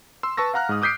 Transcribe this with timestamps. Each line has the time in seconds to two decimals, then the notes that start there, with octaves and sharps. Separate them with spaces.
0.23 C6 E6
0.37 B4 A5 C#6 E6 A#6
0.54 F5 F#5 A#5 F6 F#6
0.69 G#2 D#6
0.82 D6 D#6 G6 B6 C7 D7